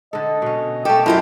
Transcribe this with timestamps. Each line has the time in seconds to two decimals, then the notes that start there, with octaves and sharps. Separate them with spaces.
0.13 D3 A4 D#5
0.42 B2 C#4
0.85 A3 C#4 G4 A4 G5
1.06 F#2 E4 F4 G4 A4 B4